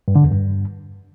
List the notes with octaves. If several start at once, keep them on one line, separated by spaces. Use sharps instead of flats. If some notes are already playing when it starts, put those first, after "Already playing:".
G2
D3
E2
G2